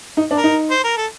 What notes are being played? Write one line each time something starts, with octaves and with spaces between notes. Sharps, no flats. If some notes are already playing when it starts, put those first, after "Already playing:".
D#4
D4
A#4
D#4
C5
A#4
A4